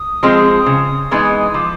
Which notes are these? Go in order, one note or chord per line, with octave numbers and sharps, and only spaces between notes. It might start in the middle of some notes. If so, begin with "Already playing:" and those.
Already playing: D#6
F3 G#3 C4
C#3
E3 G#3 B3 D#4
D#6
F3 D6